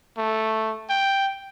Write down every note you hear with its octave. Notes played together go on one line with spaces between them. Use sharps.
A3
G5